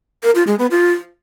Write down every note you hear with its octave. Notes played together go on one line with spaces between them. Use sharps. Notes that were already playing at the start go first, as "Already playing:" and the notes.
A#4
F4
G#3
B3
F4